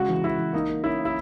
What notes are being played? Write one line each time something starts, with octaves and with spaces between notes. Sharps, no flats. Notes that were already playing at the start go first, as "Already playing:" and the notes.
Already playing: C#3 G#3 F#4
E3
E3 E4
E3
A#3 D#4
A#3
C#4 E4
A#3
E4